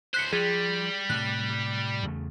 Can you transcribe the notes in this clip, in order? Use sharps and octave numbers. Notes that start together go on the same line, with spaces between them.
C#2 C5 F#6 B6 C#7
F3 G3 G#4
A2 C3 F#6
E2 C#3 A3